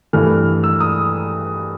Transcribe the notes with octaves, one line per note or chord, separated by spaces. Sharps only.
G2 E3 A3 F6
E6
D#6